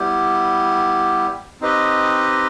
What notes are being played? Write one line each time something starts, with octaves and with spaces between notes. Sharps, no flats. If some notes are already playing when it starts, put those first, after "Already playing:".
Already playing: G3 B3 E4 G4
C4 D#4 G4 B4 D#5